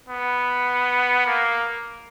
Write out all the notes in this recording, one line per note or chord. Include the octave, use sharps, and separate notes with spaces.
B3
A#3